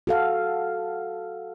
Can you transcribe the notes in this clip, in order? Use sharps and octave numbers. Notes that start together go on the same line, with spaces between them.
F#4 A4 F5